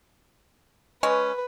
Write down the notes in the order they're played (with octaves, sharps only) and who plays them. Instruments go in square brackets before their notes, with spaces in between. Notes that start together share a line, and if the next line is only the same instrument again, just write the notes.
[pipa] G#3 C#4 [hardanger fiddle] B4